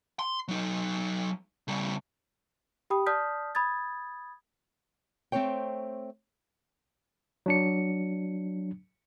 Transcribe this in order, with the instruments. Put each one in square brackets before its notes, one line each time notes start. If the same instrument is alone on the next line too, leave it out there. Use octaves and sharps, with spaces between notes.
[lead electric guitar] C6
F#3 D#4
C#3 G3
[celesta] G4 G5 B5 D#6
D5 A5 D#6 F6 G6 B6
B5 D#6 G#6 A6
[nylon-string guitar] A3 C4 C#4 C5 C#5 G5
[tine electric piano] F#3 D4 C#7